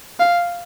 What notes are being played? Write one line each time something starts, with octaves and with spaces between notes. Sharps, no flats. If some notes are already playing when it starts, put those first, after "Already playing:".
F5